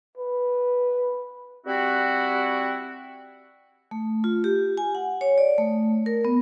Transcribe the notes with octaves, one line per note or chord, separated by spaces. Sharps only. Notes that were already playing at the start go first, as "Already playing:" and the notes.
B4
G3 C4 E4 F#4
A3
F4
G4
G#5
F#5
C#5
D5
A3
A#4
B3